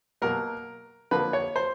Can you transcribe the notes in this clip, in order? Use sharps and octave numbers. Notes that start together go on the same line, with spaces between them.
B2 F#3 A#3 A#4
D3 F3 A#3 B4
C#5
C5